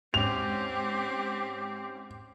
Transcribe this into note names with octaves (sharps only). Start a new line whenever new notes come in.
G#2 C4 C#4 G4 F7